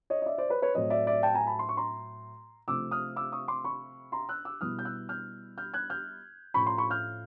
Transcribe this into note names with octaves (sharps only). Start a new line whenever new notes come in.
C#5 D#5
D#5
D5 E5
C5 D5
B4 C#5
B4 C#5
A2 F#3 A3 C4 C#5 D#5
D5 E5
D5 E5
G5 A5
G#5 A#5
A5 B5
C6
C#6
A#5 C6
C3 F3 A3 C4 D6 E6
D#6 F6
D6 E6
C#6 D#6
C6 D6
B5 C#6
A#5 C6
E6 F#6
D6 E6
B2 G3 B3 E4 D#6 F6
G6
E6 F#6
F6 G6
F6 G6
F#6 G#6
F6 G6
A2 F3 A3 C#4 B5 C#6
A#5 C6
B5 C#6
F6 G6